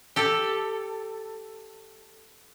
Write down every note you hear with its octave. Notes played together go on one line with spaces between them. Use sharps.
G4 A4